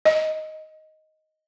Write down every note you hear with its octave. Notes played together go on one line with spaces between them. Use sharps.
D#5